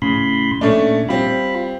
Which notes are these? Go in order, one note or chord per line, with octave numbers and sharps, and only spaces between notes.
A2 C#3 B5 C6
A#2 A3 C#4 D4
G3 C4 F4 B5